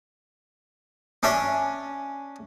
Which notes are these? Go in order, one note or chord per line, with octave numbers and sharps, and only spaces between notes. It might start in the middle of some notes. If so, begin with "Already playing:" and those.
C#4 D4 E5